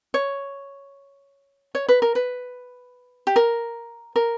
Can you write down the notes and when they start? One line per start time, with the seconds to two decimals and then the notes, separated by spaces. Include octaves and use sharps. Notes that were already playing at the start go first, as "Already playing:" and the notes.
0.14 C#5
1.75 C#5
1.89 B4
2.02 A#4
2.15 B4
3.27 G4
3.36 A#4
4.16 A#4